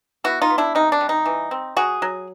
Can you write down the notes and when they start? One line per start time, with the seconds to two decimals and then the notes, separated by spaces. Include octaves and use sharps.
0.24 B3 E4 F#4
0.42 D#4 F4
0.50 B3
0.58 D4 E4
0.75 C3 D#4
0.92 D4
1.01 G3
1.09 D#4
1.26 E3
1.51 C4
1.77 F#3 F#4 G#4
2.02 F#3